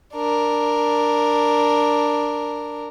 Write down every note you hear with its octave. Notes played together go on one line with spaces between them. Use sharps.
D4 A#4